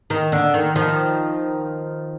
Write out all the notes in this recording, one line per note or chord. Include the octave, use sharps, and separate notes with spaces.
D#3
D3
D#3
D#3 F3